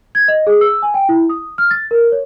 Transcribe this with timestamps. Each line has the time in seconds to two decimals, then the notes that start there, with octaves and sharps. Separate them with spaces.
0.15 G#6
0.28 D#5
0.47 G#4
0.61 E6
0.82 G#5
0.94 G5
1.09 E4
1.29 D#6
1.58 F6
1.71 A6
1.91 A#4
2.12 C#5